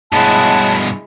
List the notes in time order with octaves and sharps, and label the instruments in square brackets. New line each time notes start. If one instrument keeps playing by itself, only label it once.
[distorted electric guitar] G2 B2 [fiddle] G#3 E4 [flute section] C#5 F#5 A5